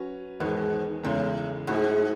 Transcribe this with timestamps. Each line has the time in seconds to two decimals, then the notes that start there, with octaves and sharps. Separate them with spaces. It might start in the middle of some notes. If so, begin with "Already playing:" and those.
Already playing: F#3 C#4 F#4 B4
0.40 E2 G#2 D#3 G#3 B3
1.04 E2 A2 C#3 G#3
1.67 G#2 F#3 A3 E4 G#4